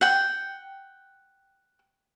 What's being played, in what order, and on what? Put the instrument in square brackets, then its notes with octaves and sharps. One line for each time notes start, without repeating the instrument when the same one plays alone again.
[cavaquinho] F#5 G5